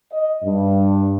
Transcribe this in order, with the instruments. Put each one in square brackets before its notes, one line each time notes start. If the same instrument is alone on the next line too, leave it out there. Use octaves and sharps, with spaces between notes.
[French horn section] D#5
G2